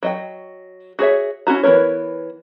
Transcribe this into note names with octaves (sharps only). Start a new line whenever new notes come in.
F#3 D#5 G5
F#4 G#4 C#5 E5
C#4 E4 F#4 A#5
E3 B3 D#4 A#4 C#5